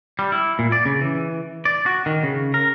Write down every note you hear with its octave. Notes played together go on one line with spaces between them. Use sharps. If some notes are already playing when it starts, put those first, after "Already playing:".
G3
E4
A#2
D5
C#3
E3
D5
F#4
D#3
C#3
A#4